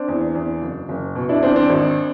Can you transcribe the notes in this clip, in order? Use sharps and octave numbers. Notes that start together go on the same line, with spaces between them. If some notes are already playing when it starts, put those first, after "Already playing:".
Already playing: C4 D4
E2
E2
F#1
F#1
B2
D4 E4
E2 C4 D4
C4 D4
G#1